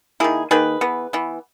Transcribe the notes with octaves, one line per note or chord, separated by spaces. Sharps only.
D#3 A#3 E4 G#4
D#3 A#3 G#4 B4
E3 B3
E3 B3